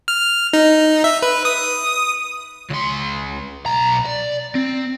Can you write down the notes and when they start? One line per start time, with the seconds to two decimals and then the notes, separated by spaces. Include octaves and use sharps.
0.08 F6
0.53 D#4
1.04 E5
1.22 B4
1.45 D#6
2.70 C#2 C6
3.66 B1 A#5
4.05 D5
4.55 C4